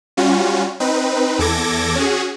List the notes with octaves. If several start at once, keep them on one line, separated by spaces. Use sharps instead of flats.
G3 C#4 F4 F#4
C4 D#4 B4
E2 A4 D6 G#6 A#6
C#4 F#4 G#4